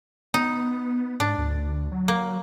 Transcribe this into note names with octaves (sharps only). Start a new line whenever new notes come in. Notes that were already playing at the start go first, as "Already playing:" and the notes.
B3 D#4
G#2 D4
D2
F#3
A#3